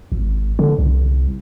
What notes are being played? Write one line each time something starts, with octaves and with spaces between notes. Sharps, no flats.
G#1
D3
C2